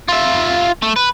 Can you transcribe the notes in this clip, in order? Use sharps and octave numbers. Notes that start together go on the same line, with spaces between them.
F4 E5
A3
B4